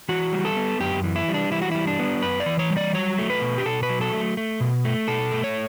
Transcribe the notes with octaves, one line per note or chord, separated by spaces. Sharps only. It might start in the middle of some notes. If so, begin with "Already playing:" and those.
E3 F#4
G3
A4
B3
F#2 G4
E3
E4
G3
D4
E3 E4
F#4
G3 E4
D4
B3
F#2 B4
D5
E3
C#5
G3
D5
F#3 C#5
A3
B4
B2
G4
B2 A4
B4
F#3
A4
A3
A3
B2
A3
B2 A4
A3
C#5